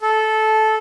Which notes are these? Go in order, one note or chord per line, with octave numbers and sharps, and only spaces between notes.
A4